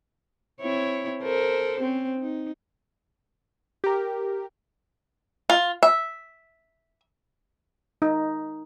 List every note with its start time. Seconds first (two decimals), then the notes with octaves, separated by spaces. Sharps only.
0.61 C4 E4 C#5
1.23 A4 A#4 C5
1.80 C4 C#4
2.20 D#4
3.84 G4 A#4
5.50 F4
5.83 E5
8.02 D#4